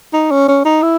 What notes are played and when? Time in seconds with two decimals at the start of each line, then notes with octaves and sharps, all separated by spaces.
0.13 D#4
0.31 C#4
0.48 C#4
0.65 D#4
0.82 E4